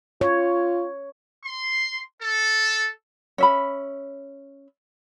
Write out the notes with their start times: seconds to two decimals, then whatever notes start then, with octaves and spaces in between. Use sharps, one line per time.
0.21 F4 C#5
1.45 C6
2.21 A4
3.38 C#4 E5 B5